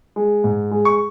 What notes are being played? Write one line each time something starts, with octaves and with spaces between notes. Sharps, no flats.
G#3
G#2
G#3
C#6